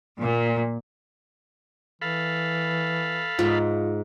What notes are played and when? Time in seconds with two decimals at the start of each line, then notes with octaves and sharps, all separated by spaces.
0.19 A#2
2.02 E3 A4 F5 B5
3.39 G#2 F4